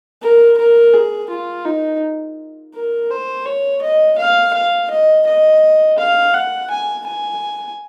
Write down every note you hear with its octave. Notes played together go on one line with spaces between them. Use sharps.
A#4
A#4
G#4
F4
D#4
A#4
C5
C#5
D#5
F5
F5
D#5
D#5
F5
F#5
G#5
G#5